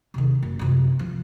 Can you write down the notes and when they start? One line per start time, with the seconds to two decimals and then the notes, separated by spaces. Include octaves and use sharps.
0.14 C3 D#3
0.43 F#1
0.59 F#2 C3
0.99 F3